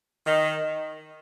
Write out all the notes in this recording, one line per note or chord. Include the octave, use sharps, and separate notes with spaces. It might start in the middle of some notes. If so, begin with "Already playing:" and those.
D#3